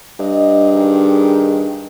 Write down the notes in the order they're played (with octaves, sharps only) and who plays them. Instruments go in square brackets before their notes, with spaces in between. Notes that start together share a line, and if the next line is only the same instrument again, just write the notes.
[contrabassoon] G2 [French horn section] D#5
[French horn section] D#3 G#4